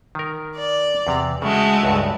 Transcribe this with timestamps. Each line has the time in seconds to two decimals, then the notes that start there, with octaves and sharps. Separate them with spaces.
0.15 D#3 A#4
0.57 D5
1.07 E2 C3 A#5
1.42 C#3 G#3 A3 F#4
1.83 C#2 G2